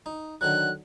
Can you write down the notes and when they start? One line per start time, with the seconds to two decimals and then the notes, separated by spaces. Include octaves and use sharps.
0.06 D#4
0.41 D3 D#3 F#3 F#6